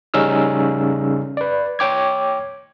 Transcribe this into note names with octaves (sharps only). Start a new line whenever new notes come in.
C#3 G3 C#4 D#4 E6 F6
B4 D5
C#5 G5 D6 G#6